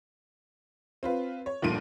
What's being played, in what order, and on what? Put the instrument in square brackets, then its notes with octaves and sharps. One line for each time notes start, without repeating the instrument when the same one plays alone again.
[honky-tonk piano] C4 F4 B4
C#5
F1 D2 G2 A#2 D7 D#7